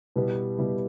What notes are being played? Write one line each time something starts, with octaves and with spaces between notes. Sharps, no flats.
B2 G3 B3 E4 G4
B2 G3 B3 E4 G4